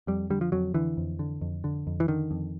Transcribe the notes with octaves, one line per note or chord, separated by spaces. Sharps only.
F2 G3
D3 G3
F3
F2 F#3
D3 E3
F2
D3
F2
D3
F2
E3
D3 D#3
F2